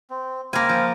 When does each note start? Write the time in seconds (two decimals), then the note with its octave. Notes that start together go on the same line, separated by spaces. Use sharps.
0.10 C4
0.53 A#3 C4 F5 G#5 B5
0.69 F3